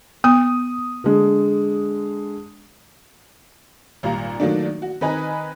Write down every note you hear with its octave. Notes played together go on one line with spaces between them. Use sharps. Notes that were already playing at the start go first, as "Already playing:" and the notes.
B3 D#6
D3 G#3
G#1 A#2 G3 F5 A#5
D#3 F3 F#3 A3 A#3 D4
F#4
D#3 C4 B4 D#5 G#5 A#5